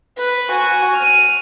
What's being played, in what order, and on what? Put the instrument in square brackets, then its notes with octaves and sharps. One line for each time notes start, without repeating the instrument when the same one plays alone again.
[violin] B4
F#4 G#5
F6 D#7